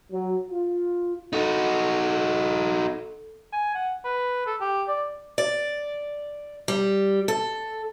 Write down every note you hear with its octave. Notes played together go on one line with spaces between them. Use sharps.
F#3
F4
D#4 F#4 A4
G#5
F#5
B4
A4
G4
D5
D5
G3
A4